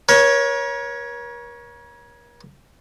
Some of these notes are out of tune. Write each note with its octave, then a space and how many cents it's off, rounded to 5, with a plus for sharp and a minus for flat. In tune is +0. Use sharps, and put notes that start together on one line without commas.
A#4 +45 C#5 +0